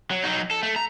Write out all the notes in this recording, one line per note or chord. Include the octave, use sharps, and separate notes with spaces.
F#3
F#3 D#4
A4
A3
A#5